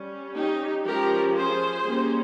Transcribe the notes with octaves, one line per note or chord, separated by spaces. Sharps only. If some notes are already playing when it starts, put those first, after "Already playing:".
Already playing: G3 C#4
D#4 G4
F3 G#3 C#4 G4 A#4
G#4 C5
G3 A#3 C#4